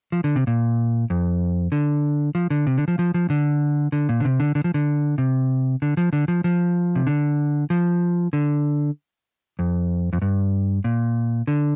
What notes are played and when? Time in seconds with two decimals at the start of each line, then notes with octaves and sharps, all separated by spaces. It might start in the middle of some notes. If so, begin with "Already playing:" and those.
0.12 F3
0.24 D3
0.36 C3
0.47 A#2
1.10 F2
1.72 D3
2.35 F3
2.50 D3
2.67 C3
2.77 D3
2.88 F3
2.99 F3
3.14 F3
3.30 D3
3.92 D3
4.09 A#2
4.20 D3
4.25 C3
4.40 D3
4.55 D3
4.64 F3
4.74 D3
5.18 C3
5.82 D3
5.97 F3
6.13 D3
6.28 F3
6.44 F3
6.96 C3
7.07 D3
7.70 F3
8.33 D3
9.59 F2
10.13 F2
10.22 G2
10.84 A#2
11.47 D3